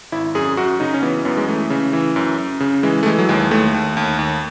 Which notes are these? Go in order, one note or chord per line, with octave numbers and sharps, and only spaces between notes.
G#1 E4
F#2 G#4
F#2 F#4
C#3 D#4
C#4
E3 B3
F#2 B3
G#3
E3 A3
C#3
E3
F#2
F#2
C#3
E3 G#3
A3
E3 G#3
F#3
D#2 G#3
D#2 A3
D#2
D#2
D#2